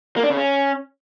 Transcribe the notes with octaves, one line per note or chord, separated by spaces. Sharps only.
A#3
D4
C#3
C#4